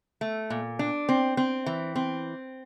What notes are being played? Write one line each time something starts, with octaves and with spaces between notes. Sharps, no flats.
A3
A#2
D4
C4
C4
E3
C4